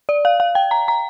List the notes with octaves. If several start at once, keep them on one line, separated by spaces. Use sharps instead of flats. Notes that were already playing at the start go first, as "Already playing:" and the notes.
D5
F5
F5
G5
A#5
A#5